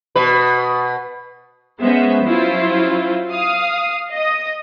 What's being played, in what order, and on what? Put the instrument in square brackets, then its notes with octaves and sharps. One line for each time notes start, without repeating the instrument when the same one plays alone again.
[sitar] B2 B4
[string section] G#3 B3 C#4 C5 E5
F#3 C#4 E4 F4 C5
F5 D#6
D#5 D#6